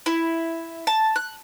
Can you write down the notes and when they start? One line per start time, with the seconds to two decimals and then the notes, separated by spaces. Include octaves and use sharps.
0.06 E4
0.87 A5
1.16 F#6